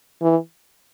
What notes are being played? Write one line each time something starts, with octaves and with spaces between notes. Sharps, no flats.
E3